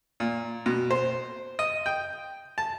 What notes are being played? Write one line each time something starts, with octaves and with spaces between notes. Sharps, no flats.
A#2
B2
C5
D#5
G5
A5